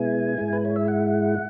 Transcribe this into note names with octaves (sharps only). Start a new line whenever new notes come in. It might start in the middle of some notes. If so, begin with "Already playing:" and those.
Already playing: B2 G#3 B3 E4 G#5
G#2 G#3 E4
B4
C#5
E5
F#5